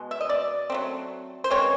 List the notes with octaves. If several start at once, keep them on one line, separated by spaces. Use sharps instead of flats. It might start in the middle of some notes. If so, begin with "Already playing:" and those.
Already playing: B2 G#3
E5
D#5
D5
F#3 A3 C4
C5
E3 G#3 C4 C#5